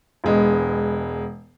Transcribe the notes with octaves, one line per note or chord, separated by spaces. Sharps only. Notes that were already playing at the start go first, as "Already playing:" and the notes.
E1 G#3 B3